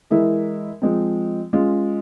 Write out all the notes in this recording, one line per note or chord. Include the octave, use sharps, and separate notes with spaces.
E3 G#3 E4 A#4 E5
F3 G#3 C4
G#3 C#4 F4